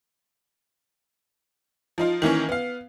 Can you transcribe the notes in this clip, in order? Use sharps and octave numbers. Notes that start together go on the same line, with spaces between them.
F3 D#4 F4
D#3 E3 A#3 C#4
B3 F5